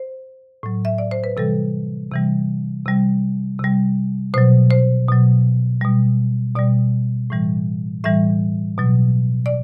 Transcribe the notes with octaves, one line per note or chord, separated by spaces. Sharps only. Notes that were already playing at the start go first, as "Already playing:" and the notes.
Already playing: C5
A2 F#3
E5
D5
C5
B4
C3 E3 G3 A4
C3 E3 G3
C3 G3
C3 G3
B2 F#3 C5
C5
B2 F#3
B2 G3
B2 G3 D5
A2 E3 G3
A2 E3 G3 E5
B2 F#3
D5